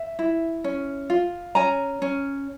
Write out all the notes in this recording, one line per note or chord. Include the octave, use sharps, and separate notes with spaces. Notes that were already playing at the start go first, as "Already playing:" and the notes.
Already playing: E5
E4
C#4
F4
C#4 G#5 A#5
C#4